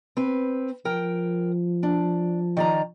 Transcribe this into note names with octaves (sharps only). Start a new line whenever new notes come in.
C4 B4
F3 A#4 G5
D4
D#3 D5 A#5